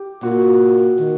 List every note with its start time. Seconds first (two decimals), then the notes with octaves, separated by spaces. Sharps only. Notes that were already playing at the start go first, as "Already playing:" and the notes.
Already playing: G4
0.23 A#2 F#4
1.00 D#3